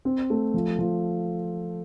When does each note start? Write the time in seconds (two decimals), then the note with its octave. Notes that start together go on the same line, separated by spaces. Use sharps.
0.05 C4
0.30 A3
0.54 F3
0.79 F3